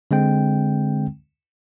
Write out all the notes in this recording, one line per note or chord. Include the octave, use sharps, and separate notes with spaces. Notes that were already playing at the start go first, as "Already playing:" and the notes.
D3 G#3 C4 G5